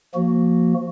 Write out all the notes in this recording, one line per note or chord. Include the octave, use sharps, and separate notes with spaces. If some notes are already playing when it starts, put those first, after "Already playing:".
F3 A#3 F#4